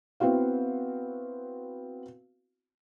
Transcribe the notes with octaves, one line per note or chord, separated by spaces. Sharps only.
B3 C4 E4 F#4 F5